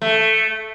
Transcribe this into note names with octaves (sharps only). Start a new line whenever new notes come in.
A3